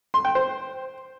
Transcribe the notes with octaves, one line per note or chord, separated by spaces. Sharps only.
C6
G5
C5